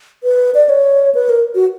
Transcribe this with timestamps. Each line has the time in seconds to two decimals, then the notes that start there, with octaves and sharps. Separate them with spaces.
0.24 B4
0.54 D5
0.69 C#5
1.15 B4
1.29 A#4
1.55 F#4